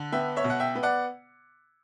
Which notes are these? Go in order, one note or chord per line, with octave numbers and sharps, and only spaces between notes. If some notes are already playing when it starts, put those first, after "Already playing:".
Already playing: D3
B3 E5 G5
C#5 E5
B2
F#5
E5 G5
B3
D5 F#5